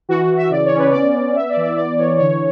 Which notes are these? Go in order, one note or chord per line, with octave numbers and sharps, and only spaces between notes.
E3 F#4
F#4
E3
E5
C#3 D5
C#5
C#4
B4
B3 D5
B3
B3 E5
D5
E3
D5
B3 D5
E3 C#5
D3 C#5